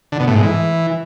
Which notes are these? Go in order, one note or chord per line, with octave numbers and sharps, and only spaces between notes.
D3
B2
A2
G#2
E3